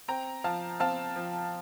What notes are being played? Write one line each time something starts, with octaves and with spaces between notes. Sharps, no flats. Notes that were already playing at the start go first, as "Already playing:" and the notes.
C4 G5 A#5
F3 F5 A5
C4 F5 A5
F3